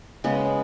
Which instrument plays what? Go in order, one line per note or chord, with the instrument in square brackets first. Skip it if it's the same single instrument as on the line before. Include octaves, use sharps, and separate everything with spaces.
[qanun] C#3 G#3 B3